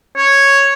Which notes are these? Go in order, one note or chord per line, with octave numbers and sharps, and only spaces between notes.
C#5